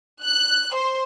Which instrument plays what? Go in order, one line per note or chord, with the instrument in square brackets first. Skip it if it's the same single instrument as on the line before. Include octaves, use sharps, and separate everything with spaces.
[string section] F#6
C5